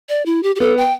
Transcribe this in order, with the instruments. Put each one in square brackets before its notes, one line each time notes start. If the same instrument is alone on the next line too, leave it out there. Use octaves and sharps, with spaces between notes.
[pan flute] D5
E4
G4
G4
[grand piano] B3 [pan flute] A4
[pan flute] G5